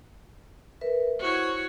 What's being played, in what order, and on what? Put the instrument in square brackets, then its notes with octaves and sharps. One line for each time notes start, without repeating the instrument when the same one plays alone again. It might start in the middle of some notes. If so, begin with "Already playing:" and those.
[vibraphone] A#4 B4 E5
[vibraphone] E4 C5 [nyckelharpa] F#4 C#5